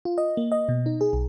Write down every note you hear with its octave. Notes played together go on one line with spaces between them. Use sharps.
F4
D#5
A#3
D#5
B2
D#4
G#4
B1